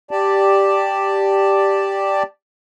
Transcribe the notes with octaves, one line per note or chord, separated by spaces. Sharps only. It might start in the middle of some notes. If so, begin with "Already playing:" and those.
G4 D5 A5